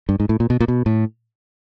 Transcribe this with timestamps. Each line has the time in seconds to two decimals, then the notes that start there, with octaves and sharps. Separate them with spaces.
0.09 G2
0.20 G#2
0.29 A2
0.40 A#2
0.50 B2
0.60 A#2
0.68 B2
0.86 A2